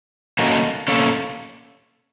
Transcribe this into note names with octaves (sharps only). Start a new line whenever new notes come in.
A#3 C#4 F#4 A4 D#5
A#3 C#4 A4